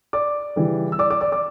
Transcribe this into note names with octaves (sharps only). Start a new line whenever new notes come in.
D5 D6
C#3 E3 G3
E6
D5 D6
D5 D6
D5 D6
D5 D6